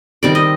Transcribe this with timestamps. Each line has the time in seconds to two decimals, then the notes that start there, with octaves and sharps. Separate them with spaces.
0.23 D#3 G3 C4 D5
0.35 D#5